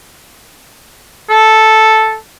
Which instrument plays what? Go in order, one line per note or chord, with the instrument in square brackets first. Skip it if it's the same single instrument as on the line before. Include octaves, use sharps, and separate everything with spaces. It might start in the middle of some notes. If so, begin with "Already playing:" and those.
[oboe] A4